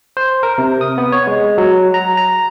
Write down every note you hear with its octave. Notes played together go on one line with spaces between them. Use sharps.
C5
A#4
C3
D#6
B3
C#5
G#3
F#3
A#5
A#5